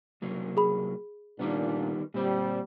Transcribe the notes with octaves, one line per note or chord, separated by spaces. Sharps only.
C2 F#3 A#3
G#4 B5
A#2 D#3 G3 B3 D4
A#2 G3 C4